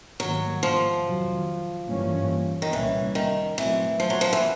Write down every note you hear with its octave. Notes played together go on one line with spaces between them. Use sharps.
G#2 D#3 F#3 G3 A#3
F3
F2 C3 D#3 F#3
G2 E3 G3 A#3 C#4
D#3
C2 A#2 E3 G3 A#3 C#4
D#3
A#2 E3 F#3 A3 C4
F3
F#3
F3
E3